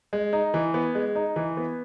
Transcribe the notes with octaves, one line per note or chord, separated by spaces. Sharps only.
G#3
D#4
E3
B3
G#3
D#4
E3
B3